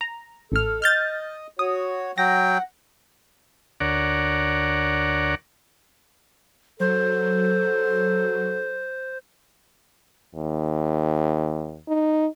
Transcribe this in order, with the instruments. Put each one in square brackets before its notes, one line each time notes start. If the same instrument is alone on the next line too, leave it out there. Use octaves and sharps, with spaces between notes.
[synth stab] A#5
[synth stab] A1 F6 [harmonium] A4
[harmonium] D#5 [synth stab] F6 G6 A6
[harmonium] F#4 C#5 [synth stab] D#6
[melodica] F#3 G5 [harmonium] F#5 [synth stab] A#6
[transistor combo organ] D2 A#4 C#5 D5 F#5
[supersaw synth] F#3 [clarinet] A4 [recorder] C5
[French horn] D#2
D#4